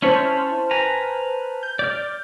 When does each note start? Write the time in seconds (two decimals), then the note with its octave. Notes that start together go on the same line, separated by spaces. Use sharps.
0.02 C#4 E4 C5 C#5 A5 F6
0.71 B4 G#5 A#5
1.63 G6
1.79 D5 F6